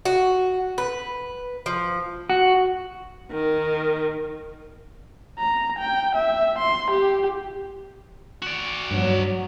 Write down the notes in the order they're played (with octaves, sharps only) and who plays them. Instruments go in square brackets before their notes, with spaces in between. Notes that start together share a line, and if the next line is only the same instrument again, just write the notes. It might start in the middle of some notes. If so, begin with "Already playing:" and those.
[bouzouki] F#4
B4
F3
[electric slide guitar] F#4
[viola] D#3
[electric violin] A#5
G5
E5
C6
G4
[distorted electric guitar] F#4 D5
[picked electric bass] G2 [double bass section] F#3